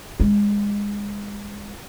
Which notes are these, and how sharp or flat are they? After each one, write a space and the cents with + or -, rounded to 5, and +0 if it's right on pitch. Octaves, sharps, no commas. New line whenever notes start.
G#3 -25